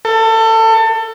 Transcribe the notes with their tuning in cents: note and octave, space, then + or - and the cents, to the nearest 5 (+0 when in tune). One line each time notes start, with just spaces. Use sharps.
A4 +25